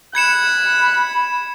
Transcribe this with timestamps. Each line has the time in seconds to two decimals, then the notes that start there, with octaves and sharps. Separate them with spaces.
0.15 B5 F#6 G#6 C#7 E7